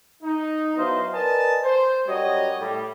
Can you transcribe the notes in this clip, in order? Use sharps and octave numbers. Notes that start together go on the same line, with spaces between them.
D#4
F#3 B3 E4 C5 D#5 F5
A#4 B4 D5 D#5 G#5 A5
C5
F#2 G3 F#4 C#5 D#5
A2 G3